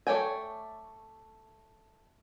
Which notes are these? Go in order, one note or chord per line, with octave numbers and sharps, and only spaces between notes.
A3 C#5 D5 G5 G#5